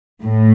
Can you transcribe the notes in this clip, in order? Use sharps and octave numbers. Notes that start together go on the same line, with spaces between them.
A2